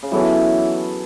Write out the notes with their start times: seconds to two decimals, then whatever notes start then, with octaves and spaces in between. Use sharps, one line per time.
0.03 C#3
0.11 E3 F#3 B3 A4 C#5